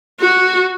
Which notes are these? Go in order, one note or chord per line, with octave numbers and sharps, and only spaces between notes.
F#4